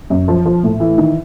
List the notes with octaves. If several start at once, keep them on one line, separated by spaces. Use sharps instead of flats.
F#2
F3
F3
A2
E3
D#3